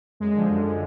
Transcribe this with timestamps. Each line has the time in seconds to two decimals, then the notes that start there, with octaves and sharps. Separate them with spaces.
0.20 F#2 G#3
0.36 D3 F3
0.50 F#2
0.65 D3 F3